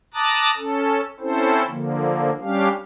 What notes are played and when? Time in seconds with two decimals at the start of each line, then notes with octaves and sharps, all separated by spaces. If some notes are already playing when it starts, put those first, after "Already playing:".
0.14 A5 A#5 D6 D#6 F#6 A6
0.57 C#4 A4
1.20 C4 C#4 E4 A4 C5
1.68 D3 F3 A#3
2.41 G3 C#4 D4 G4 F5